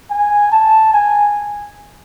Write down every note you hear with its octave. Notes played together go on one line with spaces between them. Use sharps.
G#5
A5
G#5